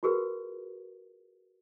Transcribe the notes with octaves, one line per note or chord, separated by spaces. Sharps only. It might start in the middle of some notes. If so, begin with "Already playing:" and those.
F4 F#4 G#4 A#4 B4